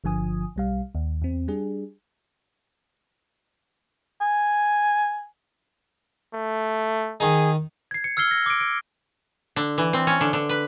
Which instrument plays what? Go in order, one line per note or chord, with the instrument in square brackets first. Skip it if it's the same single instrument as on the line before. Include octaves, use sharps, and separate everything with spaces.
[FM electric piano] G1 D3 F3 G#5 D#6
B1 G3 F5
D#2
E2 C4
G3 D4 G#4
[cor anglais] G#5
[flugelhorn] A3
[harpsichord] D#3 D#4 [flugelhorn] G#4
[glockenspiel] G#6 C7
C#7
E6 F6 G#6 C7 G7
A#6
D6 D7
D7
[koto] D3
E3
C4
C#4
D3
D3
B4